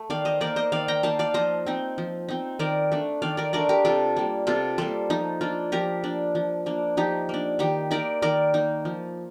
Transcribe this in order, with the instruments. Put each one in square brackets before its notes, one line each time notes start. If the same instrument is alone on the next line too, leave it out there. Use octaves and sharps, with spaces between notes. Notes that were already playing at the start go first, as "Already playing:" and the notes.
Already playing: [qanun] A3
D#3 D5 F5
C5 D#5
A#3 D#4 A#4 D5
C5 D#5
D#3 D5 F5
G5 A#5
A#3 D#4 F5 A5
D5 F5
F3 C5 D#5
C4 D#4
F3
C4 D#4
D#3 A#4 D5
A3 D4
D#3 D5 F5
A#4 D5
A3 D4 A#4 D5
G4 A#4
C3 F4 A4
G3 A#3
C3 F4 A4
G3 A#3 A4 C5
F3 D#4
A#3 D4 F4
F3 G4 A#4
A#3 D4
F3
A#3 D4
F3 D#4 G4
A#3 D4
D#3 D#4 G4
A#3 D#4 A#4 D5
D#3 A#4 D5
A#3 D#4
F3